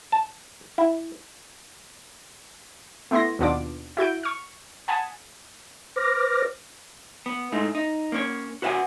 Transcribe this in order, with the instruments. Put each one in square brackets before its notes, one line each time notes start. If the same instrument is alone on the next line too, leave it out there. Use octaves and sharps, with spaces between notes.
[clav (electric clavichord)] A5
E4
[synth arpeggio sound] A3 B3 E4 C6 A#6
D#2 B2 B3 D4 F4 D6
E4 F#4 G6 D7
C#6 F6
F#5 G#5 A5 B5 D#6
[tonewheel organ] B4 C5 D6 F6 A#6
[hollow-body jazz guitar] B3
G#2 A3 D#4
D#4
A#3 C#4 C#5
F#4 B4 C5 F5 F#5 G#5